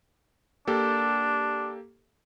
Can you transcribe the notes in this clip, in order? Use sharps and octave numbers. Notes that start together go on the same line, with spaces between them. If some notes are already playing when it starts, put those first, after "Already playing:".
A#3 D4 G4 A4